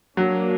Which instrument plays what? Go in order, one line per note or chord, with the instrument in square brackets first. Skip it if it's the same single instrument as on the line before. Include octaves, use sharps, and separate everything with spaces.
[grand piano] F#3 [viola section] A#3 D4 F#4